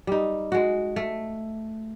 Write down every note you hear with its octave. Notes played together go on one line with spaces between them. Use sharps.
G3 D#4
G#3 F#4
A3